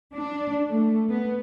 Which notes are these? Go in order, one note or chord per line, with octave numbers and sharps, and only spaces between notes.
D4
A3
B3